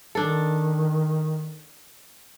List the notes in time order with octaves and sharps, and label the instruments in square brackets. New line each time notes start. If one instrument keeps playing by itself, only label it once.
[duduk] D#3 [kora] D4 A4